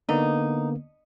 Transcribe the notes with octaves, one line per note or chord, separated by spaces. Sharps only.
D3 A#3 B3 D#4